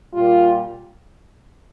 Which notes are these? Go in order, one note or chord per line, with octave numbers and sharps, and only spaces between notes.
A#2 G3 F4